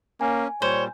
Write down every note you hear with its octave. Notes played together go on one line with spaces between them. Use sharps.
A#3 C#4 G#5
A#2 G3 C5 C#5